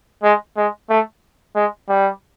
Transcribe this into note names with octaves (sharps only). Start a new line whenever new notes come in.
G#3
G#3
A3
G#3
G3